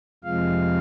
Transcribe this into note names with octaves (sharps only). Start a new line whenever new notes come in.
F2 C3 F3 G#3 F5